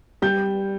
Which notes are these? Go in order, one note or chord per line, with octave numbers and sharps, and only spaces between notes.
G3 G6